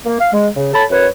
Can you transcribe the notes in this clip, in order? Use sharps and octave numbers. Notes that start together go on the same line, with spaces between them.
A#3
F5
G#3
C#3
A4 C#5 A5 B5
F#2 B4 C#5